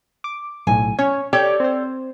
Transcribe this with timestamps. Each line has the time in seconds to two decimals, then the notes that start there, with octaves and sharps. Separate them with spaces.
0.24 D6
0.67 B1 A2 G#5
0.99 C#4 C#5
1.33 G4 A4 C#5 D5
1.60 C4 C5